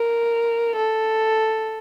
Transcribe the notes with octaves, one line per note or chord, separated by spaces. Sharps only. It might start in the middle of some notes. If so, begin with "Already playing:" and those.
Already playing: A#4
A4